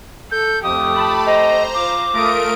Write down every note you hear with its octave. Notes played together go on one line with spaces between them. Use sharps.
A4 G6
F2 A3 G4 D#6
A5 B5
C5 D#5 A#5
F4 D6
A3 F4 A#4 D#6 D7